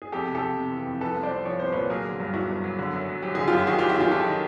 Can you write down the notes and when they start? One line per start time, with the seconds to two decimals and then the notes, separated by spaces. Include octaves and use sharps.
0.02 G#4
0.12 F2 G4 A4
0.28 C3
0.35 G4 A4
0.42 F2
0.57 C3
0.72 E3
0.87 F2
1.01 F3 A4 B4
1.16 C2
1.23 C5 D5
1.31 C2
1.45 F3 C#5
1.59 C2 C5
1.72 A#2 B4 C#5
1.90 F#3 G#4 A#4
2.05 D3
2.20 G2
2.34 F#3 E4 F#4
2.49 G2
2.64 F#3
2.79 D3
2.93 F#2
3.08 F#3
3.22 F#3 G4
3.35 D3 G#4
3.48 F#2 F4 G4
3.67 D#3 F#4 G#4
3.78 F#3 F4 G4
3.89 E4 F#4
3.96 D#3 F4 G4
4.11 D#3 G4 A4
4.26 D#3